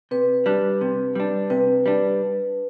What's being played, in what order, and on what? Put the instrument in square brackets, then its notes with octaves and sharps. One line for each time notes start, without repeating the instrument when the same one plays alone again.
[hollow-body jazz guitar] C3 [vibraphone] B4
[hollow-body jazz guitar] G3 D4
C3
G3 D4
[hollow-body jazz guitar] C3 [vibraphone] B4
[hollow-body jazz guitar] G3 D4